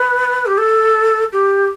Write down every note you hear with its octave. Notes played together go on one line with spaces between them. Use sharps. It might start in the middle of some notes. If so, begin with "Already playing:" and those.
Already playing: B4
G4
A4
G4